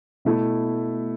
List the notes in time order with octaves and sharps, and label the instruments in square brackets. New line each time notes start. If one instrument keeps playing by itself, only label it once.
[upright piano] B2 A3 E4